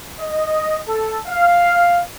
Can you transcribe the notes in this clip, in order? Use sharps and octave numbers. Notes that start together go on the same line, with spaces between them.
D#5
A4
F5